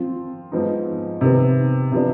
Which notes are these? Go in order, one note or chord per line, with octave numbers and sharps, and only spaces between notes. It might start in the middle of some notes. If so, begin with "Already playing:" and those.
Already playing: F3 C4 F4
G#2 F3 B3 D#4
C3 D#3 B3
C3 F3 B3 D4